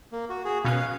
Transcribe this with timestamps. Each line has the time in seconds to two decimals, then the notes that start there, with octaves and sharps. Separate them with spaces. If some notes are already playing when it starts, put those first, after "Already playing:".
0.12 A#3
0.30 F#4
0.45 F#4 G#4
0.65 B2 C#4 F5 F#6